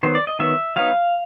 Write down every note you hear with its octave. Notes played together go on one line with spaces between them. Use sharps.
D#3 F#3 B3 C5
D5
D#5
D#3 F#3 B3 E5
F#3 B3 D#4 F5